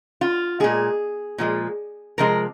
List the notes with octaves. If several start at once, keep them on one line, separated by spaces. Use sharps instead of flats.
F4
A#2 G#3 G#4
A#2 F3 G#3
C3 F3 G#3 A#4